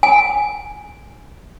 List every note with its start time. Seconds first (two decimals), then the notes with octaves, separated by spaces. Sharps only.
0.03 G#5